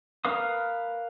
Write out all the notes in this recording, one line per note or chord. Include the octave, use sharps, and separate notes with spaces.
A#4 B4 F5 D#6